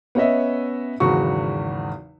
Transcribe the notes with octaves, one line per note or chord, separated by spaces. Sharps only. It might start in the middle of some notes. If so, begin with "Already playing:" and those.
B3 C#4 C#5 D#5 E5
G#1 E2 C#3 F#3 F#4 C#6